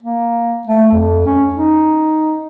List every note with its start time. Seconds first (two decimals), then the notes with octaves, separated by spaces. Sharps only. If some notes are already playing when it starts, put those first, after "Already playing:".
0.03 A#3
0.67 A3
0.92 F2
1.26 C#4
1.54 D#4